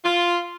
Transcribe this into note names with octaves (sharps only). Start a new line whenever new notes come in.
F4